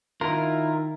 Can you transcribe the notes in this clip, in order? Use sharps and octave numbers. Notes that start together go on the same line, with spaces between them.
D#3 E4 F4 A#4